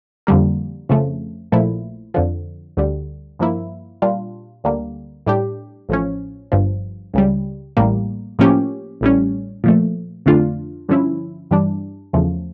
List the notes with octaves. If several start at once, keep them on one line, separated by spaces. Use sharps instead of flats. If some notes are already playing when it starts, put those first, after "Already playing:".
F2 D3 G3 A#3
F2 C#3 F3 A3
A#1 A#2 F3 A3 E4
F2 D3 F3
D2 D3 G3
G2 F3 A#3 E4
A#2 G3 D4 F4
D2 D3 G3 A#3
A2 G3 D4 G4
A1 A2 F3 C#4
G1 G2 F3
C#2 C#3 G3
A1 A2 G3 A#3
A2 F3 A#3 C#4 G4
A1 A2 G3 C#4
A#2 F3 A3
F2 D3 A3 D4 F4
G2 D3 F3 C#4 E4
G2 E3 G3 D4
E2 C#3 F3 A3